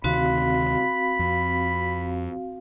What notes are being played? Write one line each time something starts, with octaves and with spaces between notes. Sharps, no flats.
D2 C3 D#3 C4 F#4 F5 B5
F2